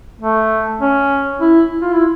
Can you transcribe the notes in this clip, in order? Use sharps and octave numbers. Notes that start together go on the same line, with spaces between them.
A3
C#4
E4
F4
E4